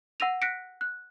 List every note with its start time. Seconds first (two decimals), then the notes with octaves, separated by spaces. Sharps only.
0.20 F#5 E6 A#6 D#7 F7
0.42 F#6 A#6 B6 C#7 D7
0.81 F#6